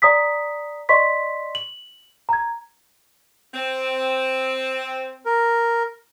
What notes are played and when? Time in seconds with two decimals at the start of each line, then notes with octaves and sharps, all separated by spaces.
0.02 D5 A#5 D#6 B6
0.89 D5 D#5 C6 C#6 B6
1.55 F#7
2.29 A#5 G#6
3.54 C4
5.25 A#4